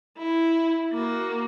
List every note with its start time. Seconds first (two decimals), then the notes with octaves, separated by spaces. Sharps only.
0.18 E4
0.93 A#3 F#4